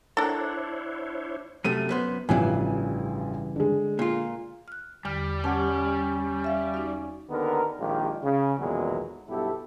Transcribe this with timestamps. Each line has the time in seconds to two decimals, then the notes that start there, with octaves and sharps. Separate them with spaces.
0.17 D4 E4 A4 A#4 C5 C#5 F#5
1.64 F#2 C3 A3 D#7
1.89 F#2 B3 C5
2.29 A1 G2 C#3 E3 F3 G#5
3.56 D3 G#3
3.99 A#2 F4
4.68 F6 F#6
5.05 E2 D3 G3 F6
5.44 C#4 G4 F#5 A5
6.44 E5 F5
6.74 D#4 F#4
7.30 D#2 D3 D#3 B3 A#4
7.80 A#1 D#3 G#3 F4 G4
8.23 C#3
8.59 B1 E2 A#2 D#3 F#3 G#3
9.29 B1 G2 B3 E4 G4 A4